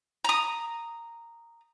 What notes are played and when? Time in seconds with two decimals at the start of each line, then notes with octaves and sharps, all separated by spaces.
0.24 A#5 D#6